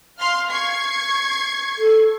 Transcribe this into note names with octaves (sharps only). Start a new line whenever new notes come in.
F5 C6 F6
C#6 G#6 C7
A4